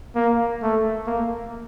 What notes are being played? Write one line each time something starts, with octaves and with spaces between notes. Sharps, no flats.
A#3
A3
A#3